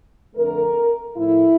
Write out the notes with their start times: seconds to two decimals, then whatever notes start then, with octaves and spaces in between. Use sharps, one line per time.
0.36 F2 D3 A3 A#4
1.17 A2 F3 A3 E4